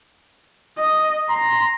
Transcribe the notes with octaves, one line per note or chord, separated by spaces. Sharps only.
D#5
A#5 C6